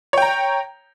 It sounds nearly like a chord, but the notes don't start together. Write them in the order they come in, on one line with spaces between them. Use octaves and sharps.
C#5 G5 A#5